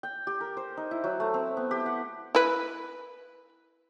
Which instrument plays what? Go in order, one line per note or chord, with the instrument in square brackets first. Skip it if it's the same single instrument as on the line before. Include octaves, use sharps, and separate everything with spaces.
[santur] G5
G4
A#4
C5
D#4
E4
F#3
A3
C4
B3
G4
F#5
[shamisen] E4 B4